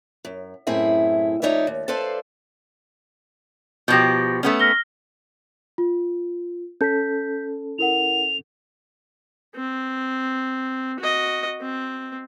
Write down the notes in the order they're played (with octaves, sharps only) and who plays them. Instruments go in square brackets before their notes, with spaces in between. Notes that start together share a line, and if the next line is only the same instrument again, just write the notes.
[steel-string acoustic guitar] F#2
F#2 A2 C4 E4 G#4 E5
F2 A#2 D#4 C#5 D5 E5
D#2
A4 B4 C5 D5 F5 A5
[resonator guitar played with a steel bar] B2 F3 G4 [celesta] G6 A#6
[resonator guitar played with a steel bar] A3 B3 C#4
[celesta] F6 A#6 G7
F4
[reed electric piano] C#4 A4 [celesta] G6 B6
[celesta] E4 A#4 F#5 [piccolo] F7
[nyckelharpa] C4
F#4 D#5
C4